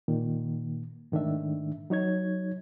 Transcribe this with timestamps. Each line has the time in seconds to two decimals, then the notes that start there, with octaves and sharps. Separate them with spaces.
0.08 A#2 D#3 A#3
1.12 G#2 D#3 A3 D4 E5
1.90 F#3 D#4 C#5 G#6